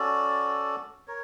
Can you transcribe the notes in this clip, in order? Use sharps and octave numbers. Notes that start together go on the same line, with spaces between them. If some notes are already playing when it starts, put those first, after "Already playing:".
Already playing: C#4 F#4 A4 D5
A#4 C#5